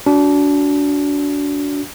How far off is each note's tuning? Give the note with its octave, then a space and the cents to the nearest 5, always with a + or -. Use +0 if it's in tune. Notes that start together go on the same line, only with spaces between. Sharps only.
D4 -30 F#4 +0